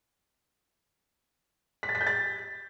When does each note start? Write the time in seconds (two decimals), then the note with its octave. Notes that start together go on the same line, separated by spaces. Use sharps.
1.83 B6
1.89 A6
1.95 B6
2.01 G6
2.07 A6